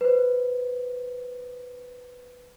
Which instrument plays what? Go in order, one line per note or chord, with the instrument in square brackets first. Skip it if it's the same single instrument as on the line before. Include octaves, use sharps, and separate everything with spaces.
[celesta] B4 C5